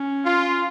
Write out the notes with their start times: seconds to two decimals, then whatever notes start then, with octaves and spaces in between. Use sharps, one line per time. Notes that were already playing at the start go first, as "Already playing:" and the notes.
Already playing: C#4
0.25 F4